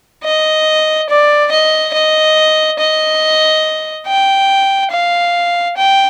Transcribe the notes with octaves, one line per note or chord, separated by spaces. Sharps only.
D#5
D5
D#5
D#5
D#5
G5
F5
G5